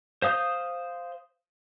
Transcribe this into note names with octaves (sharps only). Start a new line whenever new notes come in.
C5 F5 D#6 G6